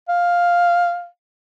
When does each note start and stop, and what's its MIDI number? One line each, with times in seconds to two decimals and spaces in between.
0.09 1.06 77